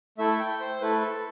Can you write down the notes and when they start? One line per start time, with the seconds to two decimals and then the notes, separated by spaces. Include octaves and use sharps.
0.18 A3 E4 A4 E5
0.39 G5
0.60 C5
0.80 A3 E4 A4 B4
1.02 A4